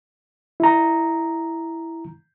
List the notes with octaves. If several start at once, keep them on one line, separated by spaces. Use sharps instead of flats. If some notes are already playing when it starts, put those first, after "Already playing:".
E4 A#5